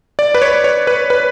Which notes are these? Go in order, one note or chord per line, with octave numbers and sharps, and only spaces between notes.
D5
B4
C#5
C#5
B4
B4